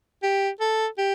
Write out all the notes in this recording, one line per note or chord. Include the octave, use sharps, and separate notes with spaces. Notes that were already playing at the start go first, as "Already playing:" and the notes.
G4
A4
G4